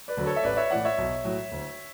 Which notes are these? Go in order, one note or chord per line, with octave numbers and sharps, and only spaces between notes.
B4 D5
D2 D3 F#3
A4 C#5
E5
A1 B4 D5
C#5 E5
A2 E3 D5 F#5
C#5 E5
B1
A2 F#3
D2